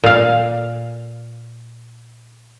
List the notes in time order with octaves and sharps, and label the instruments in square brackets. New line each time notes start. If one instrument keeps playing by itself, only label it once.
[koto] A#2 F5